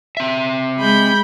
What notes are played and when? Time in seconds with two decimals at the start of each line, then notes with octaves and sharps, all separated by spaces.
0.17 C4 E5
0.78 G#3 B5 G6